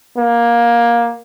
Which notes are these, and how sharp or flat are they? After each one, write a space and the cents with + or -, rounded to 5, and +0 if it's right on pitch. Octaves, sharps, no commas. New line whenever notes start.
A#3 +15